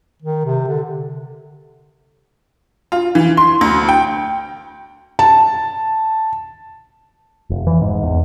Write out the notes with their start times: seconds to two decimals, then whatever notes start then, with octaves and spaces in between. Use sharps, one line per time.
0.22 D#3
0.45 C3
0.67 D3
2.92 F4
3.15 E3
3.37 C6
3.61 D2
3.89 G5
5.19 A5
7.50 F1
7.67 E3
7.82 G#2
8.03 E2